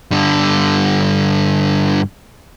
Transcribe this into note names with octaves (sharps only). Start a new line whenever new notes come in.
G2 D3